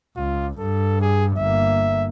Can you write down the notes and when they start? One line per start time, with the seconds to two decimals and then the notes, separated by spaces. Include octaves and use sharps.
0.17 C#2 F4
0.59 G2 A4
1.02 G#4
1.38 G1 A#3 E5